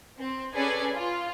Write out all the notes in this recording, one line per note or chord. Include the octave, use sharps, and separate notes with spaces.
C4
C#4 G#4 A4 B4 D5 G#5
F4